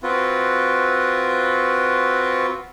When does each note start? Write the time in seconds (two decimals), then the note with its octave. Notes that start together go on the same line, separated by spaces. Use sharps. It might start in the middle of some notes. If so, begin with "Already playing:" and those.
0.03 C4 F4 F#4 B4